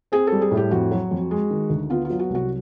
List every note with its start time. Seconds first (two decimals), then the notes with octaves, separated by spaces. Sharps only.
0.12 C4 G#4
0.27 G3 A4
0.42 G#4
0.51 A2
0.57 G4
0.71 F2 F#4
0.91 F#3
1.11 F2
1.31 G#3
1.50 D#3
1.70 D2
1.90 B3 F4
2.05 F4
2.10 F#3
2.19 F#4
2.30 C2
2.35 F#4